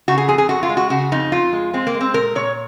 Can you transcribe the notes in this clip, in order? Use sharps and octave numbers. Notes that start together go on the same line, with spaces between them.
C#3 F#4
G#4
F2 G#4
G#4
F2 F#4
F4
G#3
F#4
C#3 F#4
F2 D#4
F2 F4
G#3
G#3 C4
A#3
G#3
C4
A#2 A#4
A#2 C#5